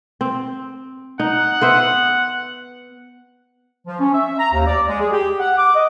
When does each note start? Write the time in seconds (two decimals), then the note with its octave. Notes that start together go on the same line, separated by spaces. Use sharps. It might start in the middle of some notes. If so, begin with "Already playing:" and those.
0.21 C4
1.20 D#4 F#5
1.62 B3 C5 E5
3.87 F3
4.00 C#4
4.14 E5
4.39 A#5
4.53 D#2
4.67 D5
4.87 G#3
5.01 G#4
5.12 G4
5.39 F#5
5.57 D6
5.75 D#5